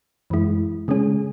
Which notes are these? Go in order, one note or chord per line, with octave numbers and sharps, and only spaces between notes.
F#2 E3 G#3 E4
C#3 G#3 C#4 G#4